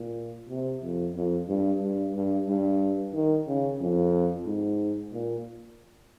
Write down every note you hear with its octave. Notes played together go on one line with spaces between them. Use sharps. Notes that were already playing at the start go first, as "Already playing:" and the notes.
Already playing: A#2
C3
F2
F2
G2
G2
G2
G2
D#3
C#3
F2
G#2
A#2